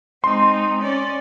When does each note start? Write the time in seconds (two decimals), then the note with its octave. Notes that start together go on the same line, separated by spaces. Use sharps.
0.24 G#3 C4 D#4 C6
0.81 C#4 D5